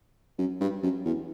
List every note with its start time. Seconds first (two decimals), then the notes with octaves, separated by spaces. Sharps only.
0.38 F#2
0.60 G2
0.83 F#2
1.05 E2